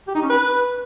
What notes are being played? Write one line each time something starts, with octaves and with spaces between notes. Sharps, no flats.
G4
D#4
C#4
B4